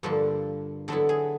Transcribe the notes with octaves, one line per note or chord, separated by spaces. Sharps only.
G2 D3 F3 A#3 A4
D3 F#3 B3 E4 A4
G#4